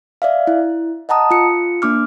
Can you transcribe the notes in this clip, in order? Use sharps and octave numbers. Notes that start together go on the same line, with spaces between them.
D5 E5 F5
E4
D#5 F#5 A5 A#5 D#6
F4 C#7
A#3 D4 D6 F6